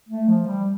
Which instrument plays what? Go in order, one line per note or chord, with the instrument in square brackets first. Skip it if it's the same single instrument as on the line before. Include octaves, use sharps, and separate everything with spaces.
[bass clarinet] A3
F3
G3